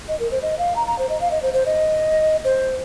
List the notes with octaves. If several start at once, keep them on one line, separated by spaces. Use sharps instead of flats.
D#5
A#4
C5
D#5
F5
A#5
A#5
C5
D#5
F5
D#5
C5
C5
D#5
C5